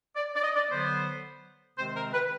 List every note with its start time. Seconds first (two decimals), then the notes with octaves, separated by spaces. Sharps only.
0.16 D5
0.35 D5
0.43 D#5
0.56 D5
0.70 D3 F#3 B3 C5
1.77 C3 D#3 G#3 C4 C5
1.95 A#4
2.13 B4